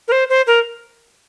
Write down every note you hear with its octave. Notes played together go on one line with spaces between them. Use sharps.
A#4
C5
C5
A#4